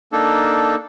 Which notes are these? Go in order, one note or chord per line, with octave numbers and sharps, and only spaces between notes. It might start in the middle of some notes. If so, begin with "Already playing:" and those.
A#3 D4 D#4 A4